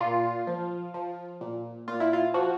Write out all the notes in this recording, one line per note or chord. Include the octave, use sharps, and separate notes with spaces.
A#2 F4
F3
F3
A#2
A#2 F4
E4
F4
F3 F#4